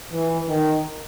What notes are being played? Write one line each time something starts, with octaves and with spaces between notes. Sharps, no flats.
E3
D#3